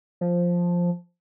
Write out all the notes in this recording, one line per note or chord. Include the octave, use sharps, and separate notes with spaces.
F3